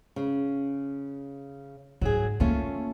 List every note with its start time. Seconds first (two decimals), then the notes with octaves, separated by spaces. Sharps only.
0.16 C#3
2.01 G#2 F#3 G#4
2.40 D#3 A3 A#3 C#4 F4